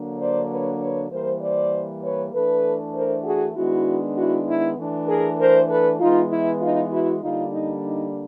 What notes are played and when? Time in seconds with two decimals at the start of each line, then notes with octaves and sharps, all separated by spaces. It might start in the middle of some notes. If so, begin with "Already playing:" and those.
Already playing: D3 F#3 A#3 D4
0.19 C5 D5
0.50 B4 C#5
0.80 B4 C#5
1.11 E3 G3 A#3 A#4 C5
1.41 C5 D5
2.03 B4 C#5
2.33 E3 A3 D4 A4 B4
2.95 A#4 C5
3.25 F#4 G#4
3.55 D#3 G#3 B3 D4 E4 F#4
4.16 E4 F#4
4.48 E4
4.78 E3 A3 D4
5.08 G#4 A#4
5.38 A#4 C5
5.69 A4 B4
6.00 E3 G#3 B3 D#4 F4
6.31 E4
6.61 D#4 F4
6.91 E4 F#4
7.22 D3 G3 A#3 D4 D#4 F4
7.53 D#4
7.84 D#4